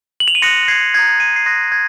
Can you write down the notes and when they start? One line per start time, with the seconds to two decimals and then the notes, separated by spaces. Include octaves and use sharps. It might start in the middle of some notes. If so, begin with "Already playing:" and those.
0.20 F#7
0.28 F7
0.35 D#7
0.42 C6 D#6 F#6 A#6 C#7
0.63 A#6
0.68 G#6 C7
0.94 A#5 D#6 F#6 G#6 C7
1.20 C7 D#7
1.36 C7
1.46 C6 D#6 F#6 A#6
1.72 G#6